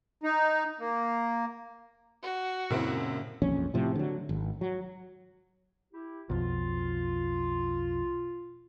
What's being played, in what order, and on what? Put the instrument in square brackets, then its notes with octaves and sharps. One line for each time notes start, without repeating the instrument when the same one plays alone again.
[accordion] D#4
A#3
[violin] F#4
[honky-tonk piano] F#2 C4 E4 [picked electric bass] A#2 C#3
[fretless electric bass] E1 A#1 F2 C#4
A2 C3 F3
D3 F#3
G#1
F#3
[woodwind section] E4 G4
[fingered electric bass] B1 F2 [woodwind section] F4